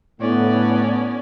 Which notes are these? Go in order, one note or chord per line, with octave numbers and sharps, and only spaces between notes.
A2 D3 B3 C#4 D5